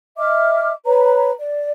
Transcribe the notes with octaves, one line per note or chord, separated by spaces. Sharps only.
D#5 E5 D6 F6
B4 C#5 A#5
D5